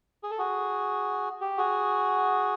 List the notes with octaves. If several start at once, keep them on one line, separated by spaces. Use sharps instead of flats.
G#4
A4
F#4 G#4
G4
F#4 G#4